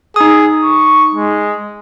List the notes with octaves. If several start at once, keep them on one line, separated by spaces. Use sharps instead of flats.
D#4 G#4 D#6
C#6
G#3